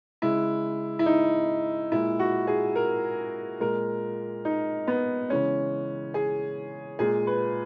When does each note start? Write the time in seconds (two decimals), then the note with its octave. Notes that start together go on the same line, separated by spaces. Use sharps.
0.22 C#3 G#3 E4
0.99 E4
1.06 D#4
1.92 A#2 G#3 E4
2.19 F#4
2.47 G#4
2.75 A#4
3.60 A#2 G#3 A#4
4.45 D#4
4.87 B3
5.30 C#3 E3 G#3 C#4
6.14 G#4
6.99 A#2 G#3 G#4
7.27 B4